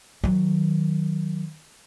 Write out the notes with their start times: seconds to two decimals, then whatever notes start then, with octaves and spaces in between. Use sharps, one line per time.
0.24 D#3 F#3